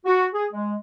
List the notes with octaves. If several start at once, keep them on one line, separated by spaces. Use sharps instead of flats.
F#4
G#4
G#3